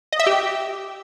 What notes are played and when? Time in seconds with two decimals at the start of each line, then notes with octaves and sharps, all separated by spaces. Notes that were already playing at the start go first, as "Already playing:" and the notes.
0.12 D#5
0.20 E5
0.27 G4